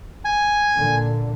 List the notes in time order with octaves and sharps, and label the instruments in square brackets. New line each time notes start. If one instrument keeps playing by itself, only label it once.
[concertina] G#5
[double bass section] A#2 D3